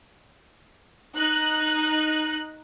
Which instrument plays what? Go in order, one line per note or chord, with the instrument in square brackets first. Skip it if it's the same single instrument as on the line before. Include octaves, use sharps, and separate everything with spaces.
[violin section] D#4 F#6